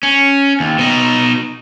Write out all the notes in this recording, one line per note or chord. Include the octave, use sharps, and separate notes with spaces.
C#4
D#2
B2 D#4